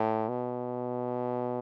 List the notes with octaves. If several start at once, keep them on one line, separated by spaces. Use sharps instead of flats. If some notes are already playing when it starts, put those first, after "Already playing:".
Already playing: A2
B2